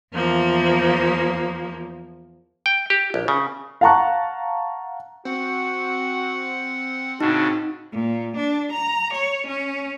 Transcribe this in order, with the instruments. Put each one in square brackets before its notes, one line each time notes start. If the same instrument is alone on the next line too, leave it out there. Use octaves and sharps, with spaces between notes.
[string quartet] E2 F3 A#3
[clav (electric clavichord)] G5
G4
A#1
C#3
[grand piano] F5 F#5 A5 A#5 C#6 F#6
[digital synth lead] C4 [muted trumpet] F#4 [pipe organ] F#5
[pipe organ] A2 C#3 D4 [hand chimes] D#4 [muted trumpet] F#4
[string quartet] A#2
D4
A#5
C#5
C#4